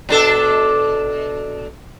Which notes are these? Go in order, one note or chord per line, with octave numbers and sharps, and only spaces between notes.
B2 D4 A4